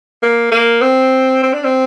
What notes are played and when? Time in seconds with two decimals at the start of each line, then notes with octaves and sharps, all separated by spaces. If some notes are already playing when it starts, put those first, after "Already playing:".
0.23 A#3
0.52 A#3
0.82 C4
1.43 C4
1.53 D4
1.64 C4